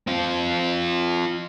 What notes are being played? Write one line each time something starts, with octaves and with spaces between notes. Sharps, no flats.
C4 F4